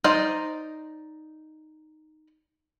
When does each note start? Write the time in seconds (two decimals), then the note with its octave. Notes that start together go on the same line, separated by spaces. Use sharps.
0.04 D#4 C5 D5 D#5 A#5